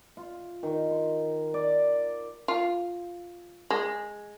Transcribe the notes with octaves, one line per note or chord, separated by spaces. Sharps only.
F4
D#3
C6
D5
F4
G#3